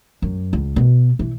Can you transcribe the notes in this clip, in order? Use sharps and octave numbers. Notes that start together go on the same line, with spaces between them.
F#2
C#2
B2
E3